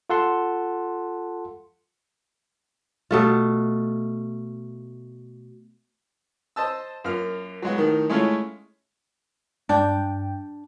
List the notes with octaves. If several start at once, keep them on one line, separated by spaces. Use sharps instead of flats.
F4 A4 F#5 A5 C6
B2 A3 F4
C5 D#5 A5 E6
F#2 A#3 F4 F6
F#3 G#3 B3
A2 D#3
G#3 A3 C#4 E4 F4
G2 D4 G5